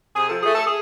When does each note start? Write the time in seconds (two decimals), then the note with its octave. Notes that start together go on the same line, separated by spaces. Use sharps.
0.16 C3 G#4
0.29 F3 A4
0.42 A3 G#4
0.55 A4
0.67 G#4